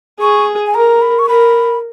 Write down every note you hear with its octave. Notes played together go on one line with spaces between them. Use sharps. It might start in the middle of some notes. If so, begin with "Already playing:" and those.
G#4 C#6
G#5
A#4 A#5
B5
C#6
A#4 B5